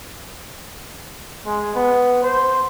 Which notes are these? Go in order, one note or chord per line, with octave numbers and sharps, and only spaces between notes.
G#3
B3
C5